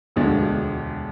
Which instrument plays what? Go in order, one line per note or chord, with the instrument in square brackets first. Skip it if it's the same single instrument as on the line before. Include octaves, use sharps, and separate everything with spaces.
[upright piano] E1 D2 D3 F3 G#3